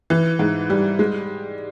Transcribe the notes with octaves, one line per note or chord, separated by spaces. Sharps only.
E3
G#2
G3
G#3